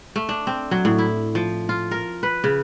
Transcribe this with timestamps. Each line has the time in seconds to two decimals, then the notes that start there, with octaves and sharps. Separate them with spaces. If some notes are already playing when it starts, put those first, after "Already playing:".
0.16 A3
0.29 D4
0.47 C4
0.71 F#3
0.85 A2
0.99 E4
1.35 F3
1.69 F4
1.91 A#4
2.23 B4
2.44 C#3